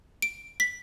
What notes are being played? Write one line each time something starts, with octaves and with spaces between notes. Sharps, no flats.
D7
B6